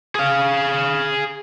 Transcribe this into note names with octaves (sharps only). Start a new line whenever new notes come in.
G#4 F5